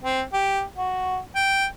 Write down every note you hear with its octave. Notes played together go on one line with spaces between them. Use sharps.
C4
G4
F#4
G5